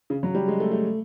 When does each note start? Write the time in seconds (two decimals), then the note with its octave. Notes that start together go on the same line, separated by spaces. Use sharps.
0.10 C#3
0.23 F#3
0.35 G3
0.48 G#3
0.60 A3
0.71 A3